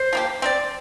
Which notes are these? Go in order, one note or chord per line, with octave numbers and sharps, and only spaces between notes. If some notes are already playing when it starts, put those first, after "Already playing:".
Already playing: C5
F3 A#3 G4
C4 A#4 D5